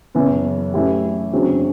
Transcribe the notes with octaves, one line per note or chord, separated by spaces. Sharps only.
F#1 F#2 E3 B3
F#2 E3 A3 E4 G4
F#1 E2 D3 F#3 C4